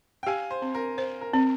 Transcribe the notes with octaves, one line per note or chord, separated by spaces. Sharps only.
G5
G4 F5 G#5
C5
C4
A#4
C5
A#4
C4